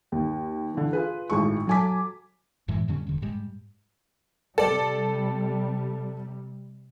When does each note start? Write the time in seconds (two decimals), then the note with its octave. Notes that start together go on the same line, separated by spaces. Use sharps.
0.12 D#2
0.74 D3 E3
0.93 F4 G#4 B4
1.30 G#1 A2 G#3 C#6
1.67 F#3 A4 G#5 A5 D6 B6
2.68 F#2 A2 E3 G#3
2.88 F2 D3 G3 C#4
3.07 E1 D3
3.22 G#2 G3 G#3
4.58 C3 G3 A4 D5